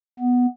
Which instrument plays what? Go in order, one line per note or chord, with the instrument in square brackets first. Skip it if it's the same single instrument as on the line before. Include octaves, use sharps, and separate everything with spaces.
[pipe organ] B3